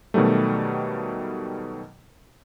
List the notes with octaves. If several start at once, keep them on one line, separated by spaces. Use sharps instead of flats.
B2 D#3 F#3 G3 A3